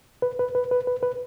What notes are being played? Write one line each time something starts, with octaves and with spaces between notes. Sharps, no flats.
B4
B4
B4
B4
B4
B4